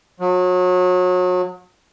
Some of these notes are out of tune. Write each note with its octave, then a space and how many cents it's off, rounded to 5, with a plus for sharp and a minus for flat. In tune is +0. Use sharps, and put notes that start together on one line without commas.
F#3 -30